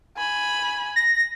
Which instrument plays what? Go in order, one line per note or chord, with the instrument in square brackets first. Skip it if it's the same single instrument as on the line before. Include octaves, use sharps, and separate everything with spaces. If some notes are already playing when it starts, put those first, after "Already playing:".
[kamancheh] G#5 B5
[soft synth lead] A#6